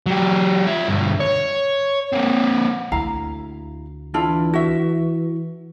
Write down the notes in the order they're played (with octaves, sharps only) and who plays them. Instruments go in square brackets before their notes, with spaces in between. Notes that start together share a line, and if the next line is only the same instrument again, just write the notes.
[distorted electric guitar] F#3 G4
F4 E5
D2 G2
C#5
A#3 C4
[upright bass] D2 [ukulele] E4 F5 A#5
[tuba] E3 [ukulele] D4 E4 F4
[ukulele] F#4 E5